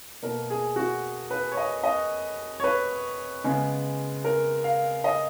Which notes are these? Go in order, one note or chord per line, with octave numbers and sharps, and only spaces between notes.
B2 A#3 A#4
G#4
F#4
B4
C#5
D#5
D#5
C#5
B4
C#3 G#3 B3
A#4
F5
D#5